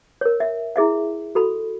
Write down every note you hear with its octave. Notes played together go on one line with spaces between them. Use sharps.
A#4 C#5
E5
E4 G#4 E5 F5
F#4 A4 B5